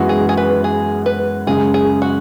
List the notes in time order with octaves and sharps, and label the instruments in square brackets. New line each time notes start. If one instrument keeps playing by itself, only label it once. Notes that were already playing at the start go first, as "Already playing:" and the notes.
Already playing: [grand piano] F#2 E3 G#3 B3 F#4
[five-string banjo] G#4
G#4
B4
G#4
B4
[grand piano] F#2 C#3 G#3 [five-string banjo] G#4
[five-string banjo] G#4
F#4